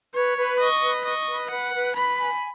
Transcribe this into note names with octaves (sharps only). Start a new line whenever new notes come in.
B4 C#5
B4
D#5 C#6
B4
D#5 C#6
B4
B4 F#5
B4
B4 B5
G#5